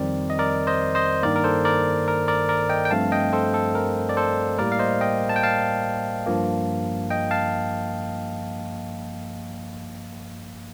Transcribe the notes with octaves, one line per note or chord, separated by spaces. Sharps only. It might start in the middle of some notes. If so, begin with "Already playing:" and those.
Already playing: F2 D#3 G3 C4 A#4 D5
D#5
A#4 D5
C5 D#5
C5 D#5
G2 D#3 A#3 A#4 D5
A#4
A4 C5
A#4 D5
A#4
A#4 D5
A#4 D5
D#5 G5
G5
G2 F3 A3 C4 F5 A5
D#5 G5
A4 C5
A4
A#4
D5
A4 C5
A2 G3 A#3 A#4 D5
F5
C5 D#5
D#5 G5
A5
G5
F5 A5
G2 F3 A#3
D#5 G5
F5 A5